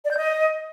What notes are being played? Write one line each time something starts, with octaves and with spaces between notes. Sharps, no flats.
D5
G6
D#5